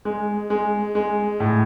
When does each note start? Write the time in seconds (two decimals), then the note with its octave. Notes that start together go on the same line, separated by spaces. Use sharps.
0.05 G#3
0.50 G#3
0.95 G#3
1.40 A2